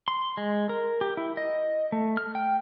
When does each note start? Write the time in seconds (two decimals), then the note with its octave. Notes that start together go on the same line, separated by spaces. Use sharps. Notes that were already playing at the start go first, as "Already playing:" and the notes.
0.08 C6
0.37 G#3
0.69 A#4
1.01 G4
1.17 E4
1.37 D#5
1.92 A3
2.17 F6
2.35 G5